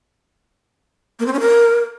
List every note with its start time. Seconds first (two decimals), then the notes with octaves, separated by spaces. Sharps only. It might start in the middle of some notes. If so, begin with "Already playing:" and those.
1.19 A#3
1.26 C4
1.33 C#4
1.40 A#4